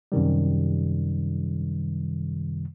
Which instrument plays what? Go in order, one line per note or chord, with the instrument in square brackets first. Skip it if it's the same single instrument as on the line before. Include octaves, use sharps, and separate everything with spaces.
[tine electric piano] F#2 C3 D#3 G3